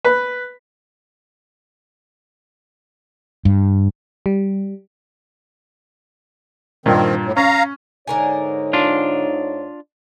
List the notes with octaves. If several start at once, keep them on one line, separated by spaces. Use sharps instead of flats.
B4
G2
G3
G2 A#2 D#3 C4
A2
C#4 F5 A#5
G#2 D3 D#4 A#4 C#5 G#5
D4 F4